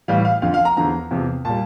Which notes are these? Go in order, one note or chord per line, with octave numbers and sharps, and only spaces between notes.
A2 E3 G3 F5
F5
F2 D3 F3 F5
F5
A#5
E2 D3 F3 A#5
E2 C3 F3
A#2 G3 A5